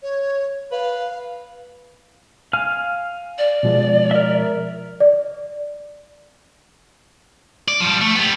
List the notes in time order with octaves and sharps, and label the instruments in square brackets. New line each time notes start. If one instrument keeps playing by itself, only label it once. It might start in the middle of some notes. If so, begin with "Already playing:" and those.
[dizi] C#5
[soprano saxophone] B4 [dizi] F5
[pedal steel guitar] F5 G#5 F6
[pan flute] D5
[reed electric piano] B2 F3 G#3
[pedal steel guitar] A#4 E5
[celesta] D5
[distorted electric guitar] D5
F3 G3
A3
G3 B3